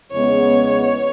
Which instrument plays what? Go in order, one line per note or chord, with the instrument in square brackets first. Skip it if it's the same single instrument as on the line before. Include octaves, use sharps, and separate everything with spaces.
[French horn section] E2 C#3 G#3 B3 [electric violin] C#5